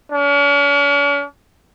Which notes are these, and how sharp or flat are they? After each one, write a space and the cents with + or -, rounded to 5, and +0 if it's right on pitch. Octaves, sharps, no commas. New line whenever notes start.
C#4 +45